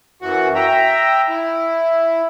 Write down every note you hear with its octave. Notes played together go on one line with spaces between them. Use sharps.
F#2 E3 F#4 F#5
E5 G5 A#5
E4